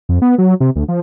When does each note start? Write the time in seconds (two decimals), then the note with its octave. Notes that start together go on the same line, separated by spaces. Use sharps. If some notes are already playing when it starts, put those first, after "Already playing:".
0.09 F2
0.22 B3
0.38 F#3
0.60 C3
0.76 D2
0.88 F3